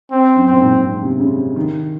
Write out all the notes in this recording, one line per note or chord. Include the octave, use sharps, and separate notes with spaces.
C4
F#2
A#2 C4
G#2
G#2
C3
C#3
D#3